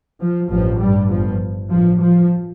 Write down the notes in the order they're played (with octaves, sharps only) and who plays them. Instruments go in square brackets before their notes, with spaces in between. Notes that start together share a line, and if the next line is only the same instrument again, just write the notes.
[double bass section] F3
A1 G2 F3
G2 G3
G1 G2 F3
A1 G2 F3
F3